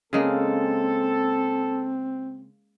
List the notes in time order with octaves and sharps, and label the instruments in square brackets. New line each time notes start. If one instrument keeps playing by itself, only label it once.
[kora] C#3 G#3 A#3 [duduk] C4 [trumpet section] A4